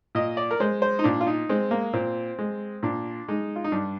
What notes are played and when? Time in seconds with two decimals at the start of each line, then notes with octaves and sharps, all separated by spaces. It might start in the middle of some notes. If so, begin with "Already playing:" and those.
0.15 A#2 D#5
0.37 D5
0.51 A#4
0.60 G#3 C5
0.82 C5
0.99 D#4
1.04 A#2 D4
1.21 F4
1.27 D#4
1.49 G#3 C4
1.71 A#3
1.93 A#2 C4
2.39 G#3
2.83 A#2 D4
3.28 G#3 D#4
3.56 F4
3.64 D#4
3.72 G2 D4